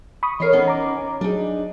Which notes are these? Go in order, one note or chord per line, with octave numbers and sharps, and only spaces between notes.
B5 C#6 D#6
E3 A#4 C#5 D#5 C7
B3 C#4 D#4
A#5 D6
F#3 D4 D#4 G#4